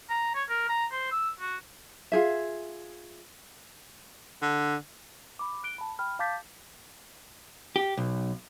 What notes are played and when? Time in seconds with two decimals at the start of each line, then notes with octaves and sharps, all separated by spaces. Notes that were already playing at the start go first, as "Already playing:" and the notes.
0.10 A#5
0.35 C#5
0.49 A#4
0.69 A#5
0.92 C5
1.12 E6
1.40 F#4
2.12 F4 G#4 E5
4.42 D3
5.39 B5 D6
5.64 F#6 D7 G7
5.78 A5 B5
5.99 G5 B5 F6
6.19 F5 A5 D6 G6 A6 B6
7.76 G4
7.97 B1